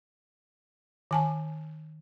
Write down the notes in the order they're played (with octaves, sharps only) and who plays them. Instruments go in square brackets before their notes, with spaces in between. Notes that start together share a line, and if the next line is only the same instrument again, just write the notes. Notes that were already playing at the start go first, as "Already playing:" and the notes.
[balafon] D#3 G#5 A5